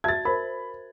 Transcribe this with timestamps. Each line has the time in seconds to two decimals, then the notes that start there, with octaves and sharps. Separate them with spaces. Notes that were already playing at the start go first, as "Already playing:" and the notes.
0.04 F#4 E5 A5 G#6 A6
0.25 A#4 C5 B5